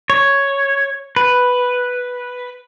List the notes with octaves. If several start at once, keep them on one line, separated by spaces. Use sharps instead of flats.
C#5
B4